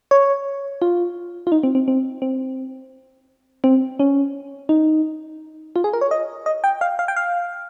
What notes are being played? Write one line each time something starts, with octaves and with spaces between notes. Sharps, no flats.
C#5
F4
F4
D#4
C4
C4
C4
C4
C4
C#4
D#4
F4
G#4
A#4
C#5
D#5
D#5
G5
F5
F5
G5
F5